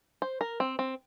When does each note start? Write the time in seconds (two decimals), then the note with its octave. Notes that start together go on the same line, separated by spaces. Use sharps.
0.22 C5
0.41 A#4
0.60 C4
0.79 C4